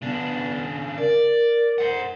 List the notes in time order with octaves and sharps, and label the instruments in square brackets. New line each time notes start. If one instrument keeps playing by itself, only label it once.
[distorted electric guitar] C#3 D4 [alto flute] B3
[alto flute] A#4 [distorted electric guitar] D5
[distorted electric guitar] C5 F#5